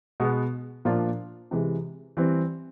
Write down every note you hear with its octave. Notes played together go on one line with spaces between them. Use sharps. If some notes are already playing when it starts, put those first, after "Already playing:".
B2 G#3 B3
A#2 F3 A#3 D4 F4
C3 E3 G#3
E3 G3 C4